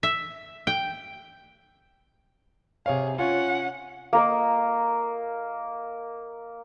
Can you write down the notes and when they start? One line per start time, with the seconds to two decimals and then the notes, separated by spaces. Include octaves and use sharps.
0.03 E5
0.67 G5
2.86 C3 G#4 C#5 F5
3.19 C#4 F4 C#5 F#5
4.13 A#3 A#4 D#5